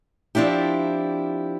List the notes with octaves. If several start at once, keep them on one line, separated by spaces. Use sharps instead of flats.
F3 C4 D4 E4 G4